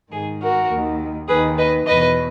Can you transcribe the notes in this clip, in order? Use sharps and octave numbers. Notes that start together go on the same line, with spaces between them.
G#2 D#3 G#4
F#4 A#4
D#2
D#3
D#2 D#3 G#4 B4
B4 D#5
E2 B2 B4 D#5